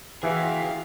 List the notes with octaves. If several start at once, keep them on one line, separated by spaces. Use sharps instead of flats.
E3 F#4 G#4 E5 F5